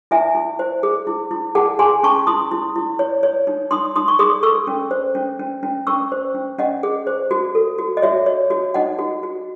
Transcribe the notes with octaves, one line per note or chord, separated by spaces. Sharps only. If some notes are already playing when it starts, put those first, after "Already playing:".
E4 E5 G#5
E4
C5
G#4
E4
E4
G#4 F#5 A5
G#4 G#5 C6
C#4 A5 C#6
E4 C6 D#6
E4
E4
C#5
C#5
D#4
D#4 C6 D#6
D#4 C6 D#6
C#6
G#4 C6 D#6
A4 C#6 E6
C#4
C5
C#4
C#4
C#4
C#4 C#6 E6
C5
C#4
C#4 D#5 F#5
G#4
C5
F#4
A4
F#4
D#5
F#4 C#5 E5
C#5
F#4
D#4 D#5 F#5
F#4
F#4